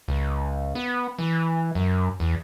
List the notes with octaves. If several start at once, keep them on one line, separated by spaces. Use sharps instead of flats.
C#2
B3
E3
F#2
E2